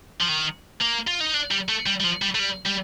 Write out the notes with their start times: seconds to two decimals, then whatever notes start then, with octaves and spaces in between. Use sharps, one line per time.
0.21 F3
0.29 D#3
0.81 A#3
1.07 F4
1.20 D#4
1.34 D4
1.51 G3
1.69 A3
1.86 G3
2.00 G3
2.04 F3
2.22 G3
2.35 A3
2.39 G3
2.66 G3